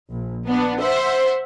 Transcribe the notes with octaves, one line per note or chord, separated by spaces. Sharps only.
A#1
B3 D4
C5 E5 F#5